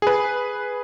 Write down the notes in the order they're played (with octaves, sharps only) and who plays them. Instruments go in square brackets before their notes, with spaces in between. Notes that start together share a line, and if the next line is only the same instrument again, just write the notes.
[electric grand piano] G#4 B4